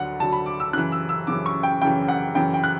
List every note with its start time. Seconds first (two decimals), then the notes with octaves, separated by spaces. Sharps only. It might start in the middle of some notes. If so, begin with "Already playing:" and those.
Already playing: D2 D3 F#3 F#5
0.20 D2 D3 F#3 A5
0.33 B5
0.46 D6
0.60 E6
0.73 F#2 C#3 E3 F#6
0.92 E6
1.09 E6
1.27 F#2 C#3 E3 D6
1.46 C#6
1.63 G5
1.82 F#2 C#3 E3 G5
2.08 F#5
2.35 F#2 C#3 E3 G5
2.54 G5
2.64 F#6